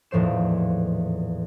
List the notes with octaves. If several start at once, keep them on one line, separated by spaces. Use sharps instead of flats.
D#1 E2 A2 F3 C5 E7